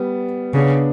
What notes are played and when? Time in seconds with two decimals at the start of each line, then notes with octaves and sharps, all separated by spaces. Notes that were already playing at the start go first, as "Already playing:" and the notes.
Already playing: G3 B3
0.54 C#3 B3 D4